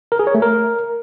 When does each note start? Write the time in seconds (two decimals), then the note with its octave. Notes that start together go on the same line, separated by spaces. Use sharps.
0.12 A#4
0.19 G#4
0.27 C#5
0.35 A3
0.42 A#4